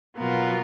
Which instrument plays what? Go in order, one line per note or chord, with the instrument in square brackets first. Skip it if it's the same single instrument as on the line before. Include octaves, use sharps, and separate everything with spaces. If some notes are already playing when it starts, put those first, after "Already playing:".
[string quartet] B2 F#3 B3 F4 A#4